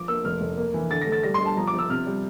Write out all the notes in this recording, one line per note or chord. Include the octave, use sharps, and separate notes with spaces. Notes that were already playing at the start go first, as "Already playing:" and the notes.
Already playing: F3 D6
A#3 E6
F1 F6
F1
A#3
E3
D3 A6
A#6
A3
A6
G3 A#6
C6
G3 A5
F3 A#5
D6
F3
E6
C3 F6
G3